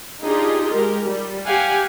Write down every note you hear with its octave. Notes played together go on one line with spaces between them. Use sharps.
D4 D#4 F4 G4 G#4
G#3 G4 A#4
G3
G4 F5 F#5 G#5